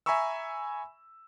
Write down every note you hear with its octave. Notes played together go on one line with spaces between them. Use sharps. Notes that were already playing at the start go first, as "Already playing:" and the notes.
E5 G#5 A#5 B5 C#6 E6